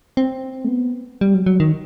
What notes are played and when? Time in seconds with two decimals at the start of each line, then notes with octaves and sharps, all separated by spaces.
0.17 C4
0.65 A3
0.68 B3
1.21 G3
1.34 F#3
1.46 F#3
1.60 D#3